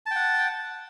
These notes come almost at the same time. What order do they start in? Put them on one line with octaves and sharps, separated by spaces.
A5 G5 F#5